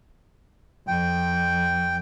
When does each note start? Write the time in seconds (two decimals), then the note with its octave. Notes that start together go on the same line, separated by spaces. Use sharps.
0.87 F2 G5